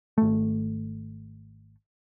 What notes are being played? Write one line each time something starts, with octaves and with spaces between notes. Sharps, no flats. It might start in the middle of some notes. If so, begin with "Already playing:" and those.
G#1 A3